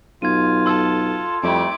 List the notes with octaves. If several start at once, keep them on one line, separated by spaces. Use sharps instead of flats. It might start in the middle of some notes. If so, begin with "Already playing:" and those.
B1 F4 G#6 D#7
A4 C6 E6
F2 G3 A3 E4 D6